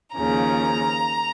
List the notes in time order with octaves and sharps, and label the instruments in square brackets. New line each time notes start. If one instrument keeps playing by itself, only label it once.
[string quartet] D#2 C#3 F3 A#5